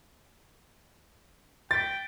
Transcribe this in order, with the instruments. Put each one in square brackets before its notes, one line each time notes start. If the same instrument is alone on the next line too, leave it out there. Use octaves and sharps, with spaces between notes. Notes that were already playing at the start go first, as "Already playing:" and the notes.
[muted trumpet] G5 [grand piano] A6 B6